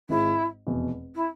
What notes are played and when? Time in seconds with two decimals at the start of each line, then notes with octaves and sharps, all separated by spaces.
0.09 G#1 G#2 G#3 E4
0.67 F1 E2 B2
1.15 E4